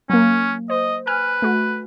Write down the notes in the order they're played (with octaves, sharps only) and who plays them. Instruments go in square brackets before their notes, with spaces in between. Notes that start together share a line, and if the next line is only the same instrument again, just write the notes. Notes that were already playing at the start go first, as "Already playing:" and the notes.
[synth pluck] F#3 A#3 [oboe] C#4
[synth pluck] C5 [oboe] D#5
[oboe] B4 [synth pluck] G#5 F6
[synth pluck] A3 F#4